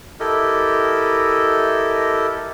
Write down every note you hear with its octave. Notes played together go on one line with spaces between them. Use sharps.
E4 G4 A4 A#4 D#5